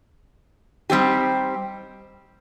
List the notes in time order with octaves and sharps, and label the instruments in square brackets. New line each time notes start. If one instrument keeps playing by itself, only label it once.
[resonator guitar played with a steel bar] G3 C4 D#4 G4